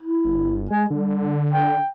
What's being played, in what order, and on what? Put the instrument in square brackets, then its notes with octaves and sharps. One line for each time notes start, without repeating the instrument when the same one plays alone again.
[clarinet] E4
[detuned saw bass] G1
[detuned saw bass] G#3 [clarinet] G#5
[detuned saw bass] D3 [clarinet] G3
[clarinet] G5